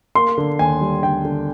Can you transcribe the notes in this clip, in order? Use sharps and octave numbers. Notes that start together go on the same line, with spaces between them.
A#3 C6
D3
D#2 G#5
G3
D3 G5
D3